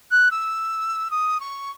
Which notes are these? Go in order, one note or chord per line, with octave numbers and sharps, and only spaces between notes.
F#6
E6
D#6
C#6